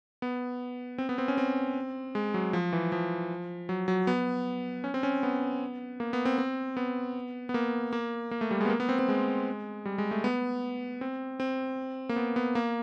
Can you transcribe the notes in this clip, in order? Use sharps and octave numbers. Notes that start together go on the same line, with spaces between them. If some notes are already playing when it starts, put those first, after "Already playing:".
B3
C4
B3
C4
C#4
C4
G#3
F#3
F3
E3
F3
F#3
F#3
B3
C#4
C4
C#4
B3
A#3
B3
C4
C4
B3
B3
A#3
A#3
A#3
A3
G3
G#3
B3
A#3
B3
C4
C4
G#3
G3
G#3
A3
B3
C4
C4
A#3
B3
B3
A#3